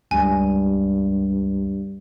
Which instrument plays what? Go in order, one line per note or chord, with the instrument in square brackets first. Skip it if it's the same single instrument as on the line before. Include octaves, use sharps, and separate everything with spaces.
[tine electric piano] C#2 G3 [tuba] G2 [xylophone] G#5